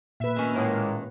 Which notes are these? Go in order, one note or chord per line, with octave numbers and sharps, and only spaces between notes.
A#2 B4 E5
D#3 C#4
A2 G#3 A#3